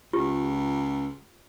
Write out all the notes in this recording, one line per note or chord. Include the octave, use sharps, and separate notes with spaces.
C#2 F4 G4